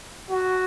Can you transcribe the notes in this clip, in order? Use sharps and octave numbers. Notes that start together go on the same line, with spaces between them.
F#4